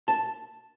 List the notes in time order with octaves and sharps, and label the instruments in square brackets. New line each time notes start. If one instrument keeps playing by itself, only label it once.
[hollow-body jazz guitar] A5